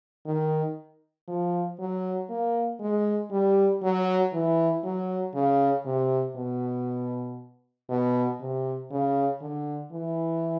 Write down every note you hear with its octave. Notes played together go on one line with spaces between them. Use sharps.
D#3
F3
F#3
A#3
G#3
G3
F#3
E3
F#3
C#3
C3
B2
B2
C3
C#3
D3
E3